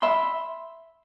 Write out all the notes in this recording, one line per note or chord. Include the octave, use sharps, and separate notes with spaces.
E5 B5 C6